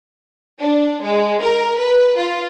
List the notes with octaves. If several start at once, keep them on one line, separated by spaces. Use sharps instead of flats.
D4
G#3
A#4
B4
F4